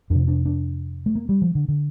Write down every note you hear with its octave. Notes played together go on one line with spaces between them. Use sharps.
F2 C3 D4
D4
D4
A3
A#3
G3
F3
D3
D3